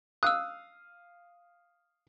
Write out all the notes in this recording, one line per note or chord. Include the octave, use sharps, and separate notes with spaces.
F5 D#6 E6 F#6